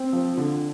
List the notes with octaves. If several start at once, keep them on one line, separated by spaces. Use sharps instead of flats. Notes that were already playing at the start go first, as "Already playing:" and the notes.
Already playing: C4
F3
D3